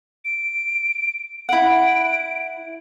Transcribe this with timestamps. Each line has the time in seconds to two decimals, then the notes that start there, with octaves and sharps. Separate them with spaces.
0.24 D7
1.49 E4 F#5 D7